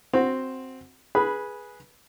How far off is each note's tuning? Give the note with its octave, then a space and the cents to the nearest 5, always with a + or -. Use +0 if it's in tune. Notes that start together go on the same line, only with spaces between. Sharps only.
C4 +0 F#4 -5
G#4 +0 B4 -15 B5 +0